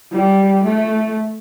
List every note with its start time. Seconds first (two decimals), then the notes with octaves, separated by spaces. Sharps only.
0.12 G3
0.64 A3